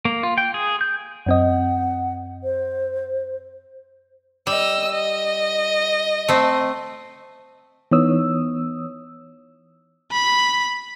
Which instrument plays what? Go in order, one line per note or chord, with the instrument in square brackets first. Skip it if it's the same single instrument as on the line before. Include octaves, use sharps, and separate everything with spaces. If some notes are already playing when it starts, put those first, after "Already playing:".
[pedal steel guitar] A#3
F4
G5
G#4
G6
[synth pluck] F#2 C4 D#5 [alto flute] F#5
[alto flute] C5
[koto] G3 [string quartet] D#5 E6
[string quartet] D#5
[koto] A3 C4
[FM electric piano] E3 B3 D#4 C#5 D#6 E6
[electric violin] B5